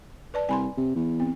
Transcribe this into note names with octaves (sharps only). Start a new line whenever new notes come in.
B4 D5 A5
C2 G#5 B5 C6
C3
E2
C4